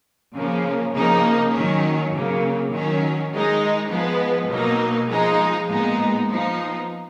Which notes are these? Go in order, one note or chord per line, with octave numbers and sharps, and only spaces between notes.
C#3 F3 A#3 C#4
C#3 F3 A#3 D#4
D#3 F#3 C#4
C#3 F#3 A#3
D#3 F#3 C#4
D#3 G#3 D#4
F3 G#3 B3
B2 F#3 A#3 D#4
F3 G#3 D#4
A#2 G#3 B3 D#4
F3 B3 D#4